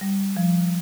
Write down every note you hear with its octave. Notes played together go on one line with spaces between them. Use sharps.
G3
F3